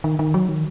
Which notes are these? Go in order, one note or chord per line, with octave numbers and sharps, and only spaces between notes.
D#3
D#3
F#3
D#3